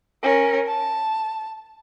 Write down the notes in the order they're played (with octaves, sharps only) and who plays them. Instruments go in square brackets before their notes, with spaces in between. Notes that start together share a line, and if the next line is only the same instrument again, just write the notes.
[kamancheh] C#4 A#4
A5